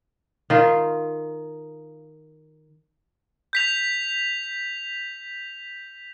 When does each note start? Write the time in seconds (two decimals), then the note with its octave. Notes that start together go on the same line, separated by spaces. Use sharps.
0.50 D#3 F4
3.53 G6 B6 F7